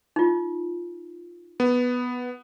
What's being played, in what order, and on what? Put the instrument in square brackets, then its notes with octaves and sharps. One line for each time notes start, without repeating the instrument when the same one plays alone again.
[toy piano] D#4 F4
[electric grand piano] B3